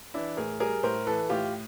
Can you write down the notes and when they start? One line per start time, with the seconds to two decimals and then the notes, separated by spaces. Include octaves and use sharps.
0.14 E3 D4 E4
0.37 A2 G#4 A#4
0.60 G3 G#4 A#4
0.83 A2 A#4 C5
1.06 E3 A4 B4
1.30 A2 F4 G4